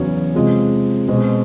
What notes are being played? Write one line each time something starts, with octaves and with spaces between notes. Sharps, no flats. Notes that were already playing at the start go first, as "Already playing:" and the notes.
Already playing: E2 C#3 F#3 B3 C#4 C#5
C3 F3 G#3
B2 G#3 C4